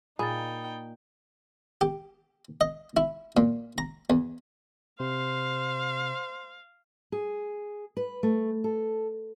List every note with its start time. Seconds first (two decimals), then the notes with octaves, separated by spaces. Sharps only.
0.19 A#2 D#4 G#4 G5 B5 D#6 A6
1.81 G4
2.61 D#5
2.97 E4
3.37 A#2
3.78 A#5
4.10 E2
5.00 C3 C5 F5
7.12 G#4
7.97 B4
8.23 A3
8.64 A4